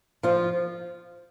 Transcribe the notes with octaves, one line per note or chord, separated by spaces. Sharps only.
F3 F4